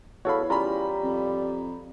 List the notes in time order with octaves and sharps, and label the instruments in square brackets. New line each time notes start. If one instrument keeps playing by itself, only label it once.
[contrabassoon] E2 [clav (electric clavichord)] F#4 A4 F5 [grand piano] C#5 B5
[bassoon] G3 [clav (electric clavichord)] C#4 F4 [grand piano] A#5 B5
[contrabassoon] F2